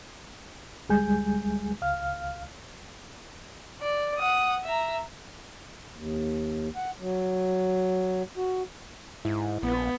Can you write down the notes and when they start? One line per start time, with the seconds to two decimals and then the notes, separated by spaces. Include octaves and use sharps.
0.89 D2 G3 G#3 G#4 G#5 G6
1.82 C#2 F5 F6
3.82 D5
4.18 F#5 D#6
4.64 E5 A#5
5.95 D#2
6.76 F#5
7.00 F#3
8.37 F#4
9.25 G#2 E4
9.63 A#1 B3